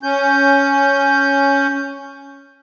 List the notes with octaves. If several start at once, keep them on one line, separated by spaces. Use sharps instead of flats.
C#4 G6